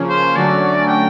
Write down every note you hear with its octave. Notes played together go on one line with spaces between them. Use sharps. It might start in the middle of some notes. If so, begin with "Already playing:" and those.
Already playing: C#3 F3 A#3 C#4
C5
D3 F#3 A3 C#4 F#4 D5
G5